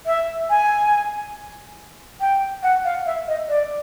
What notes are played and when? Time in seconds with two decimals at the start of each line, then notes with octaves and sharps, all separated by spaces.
0.06 E5
0.50 G#5
2.21 G5
2.63 F#5
2.85 F5
3.06 E5
3.28 D#5
3.49 D5